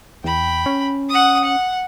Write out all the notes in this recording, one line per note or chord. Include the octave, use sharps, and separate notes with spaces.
E2 G5 B5
C#4
F#5 D#6
F#5